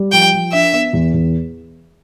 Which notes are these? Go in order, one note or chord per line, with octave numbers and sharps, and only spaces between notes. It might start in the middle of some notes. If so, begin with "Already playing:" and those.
Already playing: G3
F3 G5
F3
D4 E5
B3
E2
E2